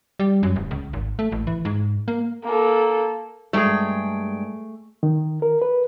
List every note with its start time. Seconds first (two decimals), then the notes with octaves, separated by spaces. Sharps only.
0.19 G3
0.43 F#2
0.56 D1
0.71 C#2
0.93 G#1
1.19 A3
1.32 A1
1.47 E3
1.65 G#2
2.08 A#3
2.44 A#3 A4
3.53 G2 G#3 A3 G#4 G5
5.03 D#3
5.42 A#4
5.62 B4